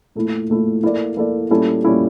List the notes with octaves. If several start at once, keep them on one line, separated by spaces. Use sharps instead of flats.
A#2 A3 E4
A#2 A3 E4
A#3 E4 A4 D5
A#3 E4 A4 D5
A#2 G3 C#4 E4 A4
A#2 G3 C#4 E4 A4